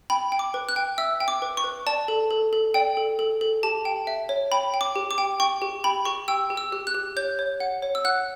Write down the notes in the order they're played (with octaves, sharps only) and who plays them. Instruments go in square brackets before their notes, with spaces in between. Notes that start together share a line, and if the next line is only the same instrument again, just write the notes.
[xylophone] G5 B5
G5
D6
B4
F#6
G5
E5 E6
G5
D6
B4
C#6
B4
D5 A5
A4
A4
A4
D5 G5
A4
A4
A4
G4 A5
G5
E5
C#5
G5 B5
G5
D6
G4
D6
G5
G5 C#6
G4
G5 B5
G4 C#6
G5 E6
G4
E6
G4
F#6
G4
C#5 G6
C#5
F#5
C#5
E6
F#5 F#6